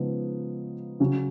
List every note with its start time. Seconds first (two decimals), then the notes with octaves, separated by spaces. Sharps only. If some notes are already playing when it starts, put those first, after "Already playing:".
Already playing: C#3 F3 G#3 B3 D#4
1.00 C#3 F#3 C#4